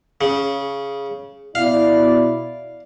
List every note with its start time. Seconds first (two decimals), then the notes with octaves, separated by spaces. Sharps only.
0.21 C#3
1.55 B2 E4 D5 F5